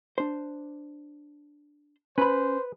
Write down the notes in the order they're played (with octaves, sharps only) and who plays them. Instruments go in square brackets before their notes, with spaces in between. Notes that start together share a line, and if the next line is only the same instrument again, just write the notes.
[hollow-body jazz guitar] D4 C5
[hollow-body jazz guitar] C#4 B5 [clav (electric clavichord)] B4 [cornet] C5